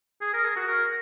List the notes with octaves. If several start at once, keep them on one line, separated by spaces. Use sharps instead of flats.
G#4
A#4
G#4
F#4
A#4